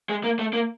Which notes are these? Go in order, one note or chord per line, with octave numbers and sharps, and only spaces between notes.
G#3
A#3
A3
A#3